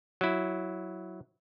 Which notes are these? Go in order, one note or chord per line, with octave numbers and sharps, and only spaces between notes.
F#3 E4